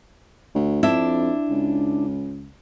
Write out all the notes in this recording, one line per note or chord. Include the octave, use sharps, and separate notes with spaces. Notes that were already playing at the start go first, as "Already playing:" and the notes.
D2
F2 D4 E4 E5
C#2